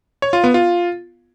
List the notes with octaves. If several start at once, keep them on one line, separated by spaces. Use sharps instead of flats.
C#5
F4
B3
F4